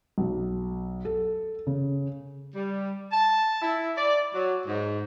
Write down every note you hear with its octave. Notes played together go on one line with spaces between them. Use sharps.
B1
A4
C#3
G3
A5
E4
D5
F#3
G#2